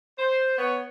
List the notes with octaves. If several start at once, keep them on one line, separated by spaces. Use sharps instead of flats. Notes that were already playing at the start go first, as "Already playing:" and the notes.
C5
B3 C#5